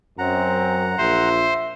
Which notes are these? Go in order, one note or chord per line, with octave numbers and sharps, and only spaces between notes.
F#2 C4 F#5 A#5
A#1 C5 E5